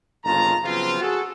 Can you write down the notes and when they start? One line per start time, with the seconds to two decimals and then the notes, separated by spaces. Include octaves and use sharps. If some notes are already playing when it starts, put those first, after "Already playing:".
0.25 G1 D#2 C#3 F4 A5 A#5
0.64 C#3 F3 F#3 B3 C4 F4
1.01 F#4 G#4 A4